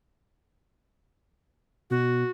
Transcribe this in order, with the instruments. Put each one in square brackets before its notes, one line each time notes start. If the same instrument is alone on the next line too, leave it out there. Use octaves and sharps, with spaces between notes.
[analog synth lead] B2 [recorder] F#4